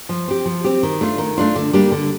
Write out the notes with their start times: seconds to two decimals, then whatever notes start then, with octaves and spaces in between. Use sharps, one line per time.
0.09 F3
0.28 C4 G4
0.45 F3
0.64 C4 G4
0.83 D#3
1.01 A3 D4 F4
1.18 D#3
1.38 A3 D4 F4
1.56 D3
1.73 G3 A#3 D4 G4
1.92 D3